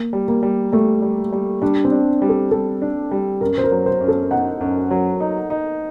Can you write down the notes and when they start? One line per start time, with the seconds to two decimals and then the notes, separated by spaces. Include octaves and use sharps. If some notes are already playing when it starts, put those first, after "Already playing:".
Already playing: A#3
0.13 G3
0.28 A#3
0.43 G3
0.72 G3 A3
1.02 G3
1.32 G3
1.62 G3 D4
1.84 C4
1.92 D4
2.22 G3
2.29 A4
2.51 G3 A4
2.82 D4
3.11 G3
3.41 F#2 A#4
3.58 C5
3.64 A#4
3.71 F#3
3.86 C5
4.01 F#2
4.08 A4
4.31 D#4 F#5
4.61 F#2
4.91 F#3
5.20 D#4
5.50 D#4